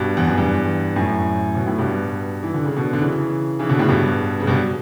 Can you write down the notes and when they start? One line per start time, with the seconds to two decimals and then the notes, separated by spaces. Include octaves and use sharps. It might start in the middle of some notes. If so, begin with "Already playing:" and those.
Already playing: G2 B2
0.17 E2
0.27 F#2
0.38 E2 G2
0.96 F#2 A2
1.55 B2
1.67 A2
1.78 G2 B2
2.43 E3
2.54 D3
2.65 C#3
2.76 B2 D3
2.93 D3
3.01 C#3 E3
3.59 C#3 E3
3.69 B2 D3
3.79 A2 C#3
3.89 G2 B2
4.40 C#3
4.47 G2 B2